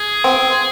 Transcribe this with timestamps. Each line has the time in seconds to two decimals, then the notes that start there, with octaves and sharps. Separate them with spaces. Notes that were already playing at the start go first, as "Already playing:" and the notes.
Already playing: G#4
0.24 C4